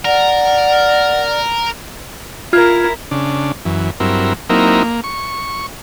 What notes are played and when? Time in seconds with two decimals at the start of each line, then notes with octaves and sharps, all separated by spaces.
0.05 A#4 D5 F#5
2.53 E4 F4 A#4 F6 G#6
3.11 C#3 D4
3.65 F#2 E3
4.00 G2 F#3 C4 E4 A#4
4.50 F#3 A#3 C4 D#4 E4 A#4
4.83 A#3
5.04 C#6